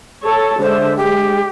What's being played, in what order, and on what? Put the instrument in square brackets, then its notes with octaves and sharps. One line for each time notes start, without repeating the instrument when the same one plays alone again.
[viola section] A4 C#5 A5
[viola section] D3 G#3 E5 [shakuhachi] C5
[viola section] G#3 [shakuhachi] G4